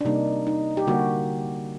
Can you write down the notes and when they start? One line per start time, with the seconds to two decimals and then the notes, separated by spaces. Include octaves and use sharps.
0.01 D4
0.05 C3 G3 A#3 D#4
0.47 D#4
0.77 G4
0.87 D3 G3 A#3 F#4